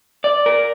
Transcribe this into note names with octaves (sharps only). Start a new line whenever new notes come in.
D5
A#4